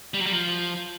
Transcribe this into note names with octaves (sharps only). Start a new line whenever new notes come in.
G3
F#3
G3
F3